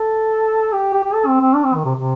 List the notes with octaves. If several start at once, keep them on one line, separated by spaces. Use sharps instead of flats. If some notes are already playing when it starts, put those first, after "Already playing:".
Already playing: A4
G4
G4
G4
A4
C4
C4
D4
C4
D#3
C3
C3